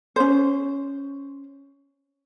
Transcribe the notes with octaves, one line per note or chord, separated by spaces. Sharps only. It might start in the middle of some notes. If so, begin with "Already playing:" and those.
C#4 C5